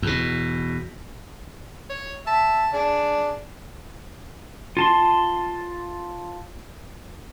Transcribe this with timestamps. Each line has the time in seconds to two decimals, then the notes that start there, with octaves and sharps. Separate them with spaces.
0.02 E2 B2
1.90 C#5
2.27 E5 A5
2.74 D4 G#4
4.77 F4 A5 C6